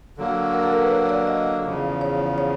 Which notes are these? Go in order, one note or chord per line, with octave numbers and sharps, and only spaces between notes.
D3 F#3 A#3
A#4
A4
A#4
B4
C#5
D5
D#5
E2 C#3 F3
C#5
C#5